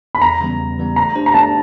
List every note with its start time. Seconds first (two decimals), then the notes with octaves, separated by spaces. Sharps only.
0.15 B5
0.22 E2 A#5
0.40 C#3 E3 G3 B3
0.59 E2
0.78 C#3 E3 G3 B3
0.96 A3 A#5
1.15 D4 G4 C5
1.26 A#5
1.34 A3 A5